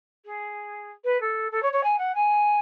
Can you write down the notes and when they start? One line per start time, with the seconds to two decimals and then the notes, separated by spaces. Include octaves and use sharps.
0.25 G#4
1.04 B4
1.20 A4
1.51 A4
1.62 C#5
1.72 C#5
1.83 G#5
1.98 F#5
2.14 G#5